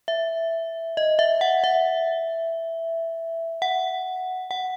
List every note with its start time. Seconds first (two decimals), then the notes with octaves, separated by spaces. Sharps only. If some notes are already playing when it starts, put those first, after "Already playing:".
0.08 E5
0.97 D#5
1.19 E5
1.41 F#5
1.64 E5
3.62 F#5
4.51 F#5